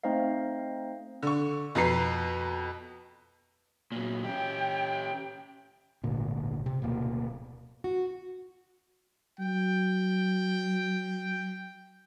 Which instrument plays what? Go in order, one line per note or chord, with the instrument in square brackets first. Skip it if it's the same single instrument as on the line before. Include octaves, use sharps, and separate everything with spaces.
[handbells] A3 C4 D#4 C5 D#5 F5
[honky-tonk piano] D3 C#6
F2 B2 B4 A#5 C7
[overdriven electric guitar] A#2 F#3
[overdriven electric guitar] C#4 G4 [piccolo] G5
[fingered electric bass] D1 G#1 D2 A#2
C3
D1 B2 A#3
[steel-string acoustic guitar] F#4
[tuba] F#3 [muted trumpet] G5